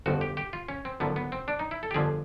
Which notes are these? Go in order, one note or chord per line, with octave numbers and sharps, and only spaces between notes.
G1 F2 C#3 F3 F#4
G4
G4
F4
C#4
C4
G#1 F#2 D3 F3 B3
B3
C4
D4
D#4
E4
A4
G4
G1 F2 D3 F3 G#4